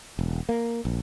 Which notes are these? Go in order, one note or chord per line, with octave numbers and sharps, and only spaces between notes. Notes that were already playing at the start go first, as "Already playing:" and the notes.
E1
A#3
A#1